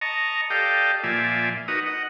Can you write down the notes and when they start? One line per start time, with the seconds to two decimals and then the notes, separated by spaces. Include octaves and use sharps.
0.01 D#5 A5 A#5 C#6
0.50 G4 A4 D5 D#5 F5 G5
1.03 A#2 F3 D5 E5 G#5
1.68 D#4 F#4 A#4 B4 D#6
1.86 D#5 F#5